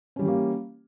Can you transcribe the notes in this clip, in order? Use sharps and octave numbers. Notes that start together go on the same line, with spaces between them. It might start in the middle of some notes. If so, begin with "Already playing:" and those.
E3 G3 A#3 C#4 G4